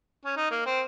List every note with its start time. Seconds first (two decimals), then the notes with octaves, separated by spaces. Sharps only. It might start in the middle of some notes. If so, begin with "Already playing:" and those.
0.25 C#4
0.37 D#4
0.51 A#3
0.66 C4